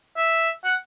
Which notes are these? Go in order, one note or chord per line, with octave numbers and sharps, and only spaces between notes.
E5
F#5